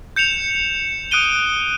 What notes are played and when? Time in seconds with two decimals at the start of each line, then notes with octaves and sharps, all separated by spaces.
0.16 G6 C#7 E7 F7
1.11 D#6 F#6 D7 D#7 G7